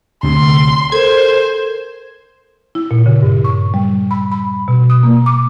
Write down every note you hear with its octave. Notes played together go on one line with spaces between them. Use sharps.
D2 C3 C6
A4 A#4 C5 G#6
E4
A#2
C#3
G2
C#6
G3
B5
B5
B2
D#6
A#3
D6